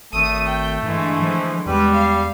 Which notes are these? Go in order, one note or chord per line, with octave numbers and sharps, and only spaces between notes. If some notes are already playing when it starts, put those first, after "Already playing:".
G#1 A3 D#6
G5
G2 D3 E3 G#3
F3
E2 G3 G#3 B4
F5